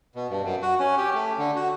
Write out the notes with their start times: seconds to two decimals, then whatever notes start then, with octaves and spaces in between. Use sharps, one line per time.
0.15 B2
0.30 G2
0.45 F#2
0.62 F#4
0.80 C#4
0.98 G4
1.14 A3
1.38 D3
1.56 F#4